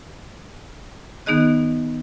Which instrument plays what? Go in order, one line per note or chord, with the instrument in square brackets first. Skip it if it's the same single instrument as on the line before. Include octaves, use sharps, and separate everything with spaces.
[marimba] D#3 B3 D#4 G#4 D#5 F#6